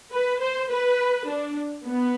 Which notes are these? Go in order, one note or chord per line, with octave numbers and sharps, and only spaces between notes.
B4
C5
B4
D4
B3